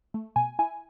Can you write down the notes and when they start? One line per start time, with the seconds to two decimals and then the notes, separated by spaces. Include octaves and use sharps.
0.14 A3
0.36 B2 G#5
0.59 E4 G#5